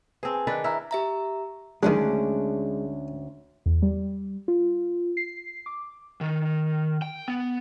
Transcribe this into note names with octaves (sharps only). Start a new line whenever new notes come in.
C4 G#4 B4 A5
G#5
D#3 D4 B4
E4 A#5 B5 F6
G4 E5 A#5
D2 D#3 F#3 G#3 C#4 D4
E2
G3
F4
C7
D6
D#3
G5
B3